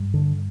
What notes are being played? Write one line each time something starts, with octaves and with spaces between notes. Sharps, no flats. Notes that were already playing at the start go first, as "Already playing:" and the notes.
Already playing: G2
D3